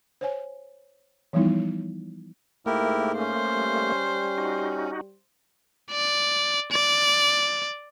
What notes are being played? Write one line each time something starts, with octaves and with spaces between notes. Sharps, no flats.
C5 C#5 G#5
E3 F3 G3 B3 D#4 E4
G#2 A3 A#3 E4 G4 A#4
C#4 C5
G3
D#4 F#4
D5
D5